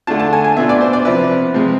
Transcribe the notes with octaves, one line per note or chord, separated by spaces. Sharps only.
D3 A3 D4 F4 A5
A5
G#5
G#5
B2 B3 D4 F4 E5
D5
C5
D5
C3 F3 B3 E4 B4
C3 F3 G#3 C4